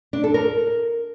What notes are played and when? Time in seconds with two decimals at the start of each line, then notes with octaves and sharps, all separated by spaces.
0.13 D4
0.24 A4
0.34 A#4